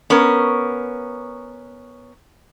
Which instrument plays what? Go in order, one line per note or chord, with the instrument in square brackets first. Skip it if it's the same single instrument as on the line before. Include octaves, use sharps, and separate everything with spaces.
[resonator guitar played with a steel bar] B3 C#4 A#4